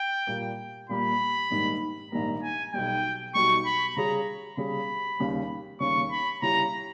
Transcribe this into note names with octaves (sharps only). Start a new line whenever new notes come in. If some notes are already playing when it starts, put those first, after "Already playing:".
Already playing: G5
A#2 G3 A#3
A#2 G3 A#3 B5
A#1 G#2 D#3 G3 A#3
A#1 G#2 D#3 G3 A#3 A#5
G#5
B1 B2 G3 G5
B1 B2 G3 C#6
B5
C#3 G3 C#4 G#4 A#5
C#3 G3 C#4 G#4 B5
D#2 C#3 G3 C#4
D#2 C#3 G3 C#4 C#6
B5
C#3 G3 C#4 E4 G4 A#5